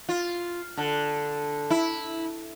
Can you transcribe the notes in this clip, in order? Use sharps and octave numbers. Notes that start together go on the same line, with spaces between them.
F4
D3
E4